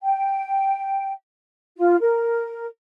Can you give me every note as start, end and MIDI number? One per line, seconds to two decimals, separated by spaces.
0.02 1.12 79
1.77 1.96 65
2.00 2.66 70